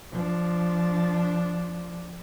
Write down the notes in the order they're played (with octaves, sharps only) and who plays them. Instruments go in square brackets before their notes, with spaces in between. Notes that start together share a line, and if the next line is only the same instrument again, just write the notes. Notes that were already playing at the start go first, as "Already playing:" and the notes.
[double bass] F3 D4